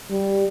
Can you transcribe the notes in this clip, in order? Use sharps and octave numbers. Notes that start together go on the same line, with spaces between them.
G3